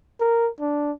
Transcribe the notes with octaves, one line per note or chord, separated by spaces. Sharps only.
A#4
D4